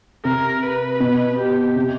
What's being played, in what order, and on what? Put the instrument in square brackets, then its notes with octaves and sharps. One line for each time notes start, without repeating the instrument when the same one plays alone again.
[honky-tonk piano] C3 [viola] A#4
[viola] B4
[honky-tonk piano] B2
[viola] G4
[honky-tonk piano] C3